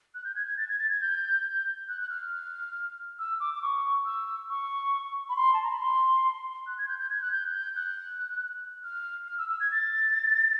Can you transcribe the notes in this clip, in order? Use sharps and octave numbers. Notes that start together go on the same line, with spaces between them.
F#6
G6
G#6
G#6
A6
G#6
A6
G#6
G6
F#6
F#6
F6
E6
D6
D6
C#6
E6
C#6
B5
C6
A5
A#5
B5
C6
F#6
G#6
G6
G6
G#6
F#6
G6
F#6
G6
F#6
F6
F6
E6
E6
G#6
A6